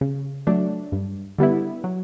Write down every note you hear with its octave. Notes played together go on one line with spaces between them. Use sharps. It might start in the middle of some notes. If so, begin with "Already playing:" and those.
C#3
F#3 A3 D4
G2
D3 G3 B3 E4
F#3